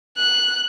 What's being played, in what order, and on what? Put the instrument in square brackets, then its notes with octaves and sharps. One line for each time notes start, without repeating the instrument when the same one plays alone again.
[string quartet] F#6